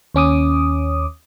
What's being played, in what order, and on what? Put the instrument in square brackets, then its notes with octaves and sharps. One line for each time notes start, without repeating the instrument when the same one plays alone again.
[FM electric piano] D#2 C#4 D6 D#6